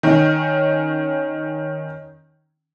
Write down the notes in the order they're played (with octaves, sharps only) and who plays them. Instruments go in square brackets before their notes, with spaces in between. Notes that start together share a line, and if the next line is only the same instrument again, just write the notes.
[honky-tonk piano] D#3 C#4